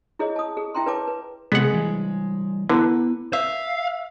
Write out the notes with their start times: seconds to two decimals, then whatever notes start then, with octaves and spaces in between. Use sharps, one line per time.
0.19 E4 G#4 C#5 D#5
0.36 A5 D#6
0.57 G#4
0.74 E4 E5 G5 A#5 C6
0.86 B4 C#5 A5 D6
1.07 B4
1.52 C3 G#3 B3 G#4 F#5
1.74 E3 G3
2.69 D3 B3 E4 B4
3.33 E5 F5